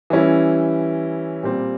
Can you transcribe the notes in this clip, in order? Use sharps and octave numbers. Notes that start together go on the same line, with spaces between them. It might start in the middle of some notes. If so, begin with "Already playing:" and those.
E3 G3 C#4 E4
A#2 G3 C4